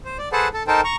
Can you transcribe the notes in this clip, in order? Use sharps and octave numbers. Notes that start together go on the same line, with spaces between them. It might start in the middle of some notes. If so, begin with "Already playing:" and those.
C5
D5
G#4 A4 B4 C5 F#5 A5
A4 A5
D#4 A4 A#4 C5 G5 A5
A#5 C#6